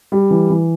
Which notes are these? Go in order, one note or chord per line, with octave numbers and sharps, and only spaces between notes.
G3
E3
E3